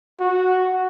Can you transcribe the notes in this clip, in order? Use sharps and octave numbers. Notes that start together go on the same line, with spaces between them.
F#4